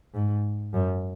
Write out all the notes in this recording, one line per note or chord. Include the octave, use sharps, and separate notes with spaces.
G#2
F#2